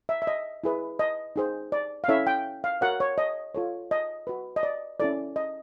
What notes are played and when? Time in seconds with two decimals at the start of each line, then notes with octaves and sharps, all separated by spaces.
0.09 E5
0.22 E5
0.27 D#5
0.64 E4 G#4 B4
0.99 D#5
1.36 D#4 G#4 C5
1.72 D5
2.04 F5
2.08 C#4 E4 A4 C#5 E5
2.27 G5
2.64 F5
2.81 F#4 A#4 C#5 F#5
3.00 C#5
3.18 D#5
3.55 F4 A4 C#5
3.91 D#5
4.27 F#4 B4
4.56 D#5
4.63 D5
5.00 C#4 E4 A4 D5
5.36 D#5